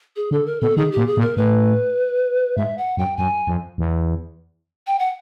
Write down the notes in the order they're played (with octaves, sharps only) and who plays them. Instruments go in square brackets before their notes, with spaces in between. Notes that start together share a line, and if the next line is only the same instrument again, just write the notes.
[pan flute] G#4
[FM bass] D3 [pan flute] A4
[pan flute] A#4
[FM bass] B2 [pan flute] A4
[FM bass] D#3 [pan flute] G#4
[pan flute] G4
[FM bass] A#2
[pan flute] G#4
[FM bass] A#2
[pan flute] A#4
[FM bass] A2 [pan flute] B4
[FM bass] G#2 [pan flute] E5
[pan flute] F#5
[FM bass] F#2 [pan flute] G5
[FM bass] F#2 [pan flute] G#5
[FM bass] F2
E2
[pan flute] G5
F#5